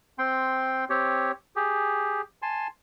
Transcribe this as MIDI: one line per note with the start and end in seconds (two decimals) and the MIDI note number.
0.18 0.85 60
0.18 0.85 79
0.18 0.85 84
0.90 1.31 60
0.90 1.31 67
0.90 1.31 73
1.56 2.21 67
1.56 2.21 68
2.42 2.67 80
2.42 2.67 81
2.42 2.67 84